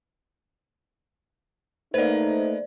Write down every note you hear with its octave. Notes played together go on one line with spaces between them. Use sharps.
A3 A#3 D#4 B4 C5 D5